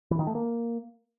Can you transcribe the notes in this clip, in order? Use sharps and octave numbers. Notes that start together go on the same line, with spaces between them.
E3
D#3
A3
A#3